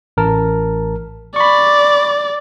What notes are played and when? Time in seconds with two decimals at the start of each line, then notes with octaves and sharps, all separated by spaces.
0.17 A1 A#4 A5
1.36 D5 B5 C#6